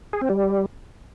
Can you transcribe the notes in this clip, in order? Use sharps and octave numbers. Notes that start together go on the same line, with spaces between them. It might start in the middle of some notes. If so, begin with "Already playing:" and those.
G#4
C4
G3